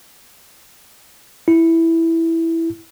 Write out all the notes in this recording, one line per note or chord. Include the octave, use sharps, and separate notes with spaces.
E4